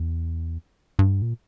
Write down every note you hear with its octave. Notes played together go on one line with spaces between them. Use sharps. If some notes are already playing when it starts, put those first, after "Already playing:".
Already playing: E2
G2
A#2